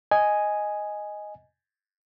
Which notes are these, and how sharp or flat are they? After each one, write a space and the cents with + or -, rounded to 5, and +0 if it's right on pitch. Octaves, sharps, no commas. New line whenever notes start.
D#5 +0 G#5 +0